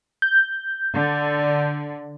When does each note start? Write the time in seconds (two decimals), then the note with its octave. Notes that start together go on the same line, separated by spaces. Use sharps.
0.22 G6
0.94 D3